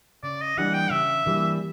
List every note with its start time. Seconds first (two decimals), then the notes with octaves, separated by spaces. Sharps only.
0.23 C#3 D5
0.41 D#5
0.57 E3 G3 A#3 D4 F#5
0.74 G5
0.90 C#3 E5
1.25 E3 G3 A#3 D4